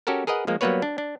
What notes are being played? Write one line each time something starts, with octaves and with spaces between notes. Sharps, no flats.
C#4 F#4 G4 A4 A#4
G#4 A#4 B4 D#5 F#5
F3 G#3 A#3
F#3 G3 A#3 B3 B4 C#5
D4
D4